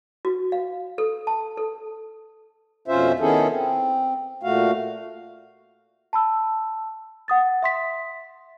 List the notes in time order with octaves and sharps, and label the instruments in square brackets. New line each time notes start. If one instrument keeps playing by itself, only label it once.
[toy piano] F#4
F5
A4
A5
A4
[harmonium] F2 B2 C#4 F4 C5 E5
D#3 B3 C#4 E4 G#4 A4
C4
A#2 A3 F#4 F5
[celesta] A5 B5 E6
F#5 D#6 A6
E5 C6 B6